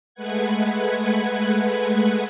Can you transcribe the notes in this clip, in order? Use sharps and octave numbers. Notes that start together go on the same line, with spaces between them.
G#3 A3 B4 F#5 G#6